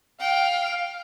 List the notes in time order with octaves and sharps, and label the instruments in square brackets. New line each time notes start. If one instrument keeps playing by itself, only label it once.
[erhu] F5 [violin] G5